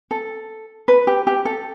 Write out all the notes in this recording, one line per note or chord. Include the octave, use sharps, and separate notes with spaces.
A4
B4
G4
G4
A4